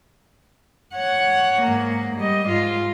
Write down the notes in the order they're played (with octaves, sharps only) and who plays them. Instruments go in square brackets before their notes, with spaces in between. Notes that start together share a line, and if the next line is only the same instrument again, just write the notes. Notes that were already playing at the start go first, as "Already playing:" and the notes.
[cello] C#5 F#5
G#2 A#3
G3 D#5
G#2 F4